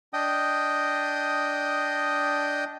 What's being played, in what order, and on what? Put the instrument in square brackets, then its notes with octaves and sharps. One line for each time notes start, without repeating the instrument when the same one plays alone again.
[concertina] D4 D#5 G5 D#6